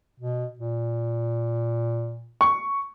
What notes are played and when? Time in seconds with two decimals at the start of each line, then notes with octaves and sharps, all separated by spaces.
0.20 B2
0.59 A#2
2.41 C#6